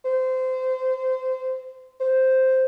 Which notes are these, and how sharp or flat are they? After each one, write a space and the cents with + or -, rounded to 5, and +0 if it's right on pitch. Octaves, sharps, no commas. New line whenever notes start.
C5 -20
C5 +0